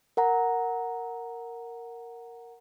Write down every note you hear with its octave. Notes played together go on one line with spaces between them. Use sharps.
A#4 F#5 A#5